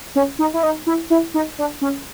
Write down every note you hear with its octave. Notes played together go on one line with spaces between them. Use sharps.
C#4
D#4
E4
D#4
E4
E4
D#4
D4
C#4